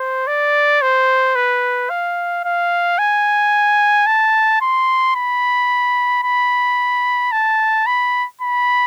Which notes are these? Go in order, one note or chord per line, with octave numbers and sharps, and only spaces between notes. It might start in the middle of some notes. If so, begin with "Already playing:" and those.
Already playing: C5
D5
C5
B4
F5
F5
G#5
A5
C6
B5
B5
A5
B5
B5